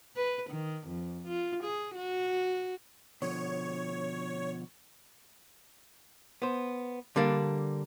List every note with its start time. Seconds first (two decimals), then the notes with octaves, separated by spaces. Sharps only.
0.16 B4
0.50 D#3
0.87 F2
1.27 F4
1.63 G#4
1.95 F#4
3.22 B2 D3 F3 C#5
6.42 B3 C5
7.16 D3 G3 A#3 D4